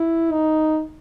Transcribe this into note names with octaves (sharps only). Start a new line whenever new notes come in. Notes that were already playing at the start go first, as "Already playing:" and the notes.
Already playing: E4
D#4